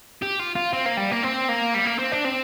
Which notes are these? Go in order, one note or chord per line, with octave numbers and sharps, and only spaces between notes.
G4
F4
F4
C4
A#3
G3
A#3
C4
A#3
G3
A#3
C4
D4
C4